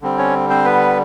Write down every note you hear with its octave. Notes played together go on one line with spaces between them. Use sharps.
D3 G3 C4
C#4 C#5
C4 C5
B3 B4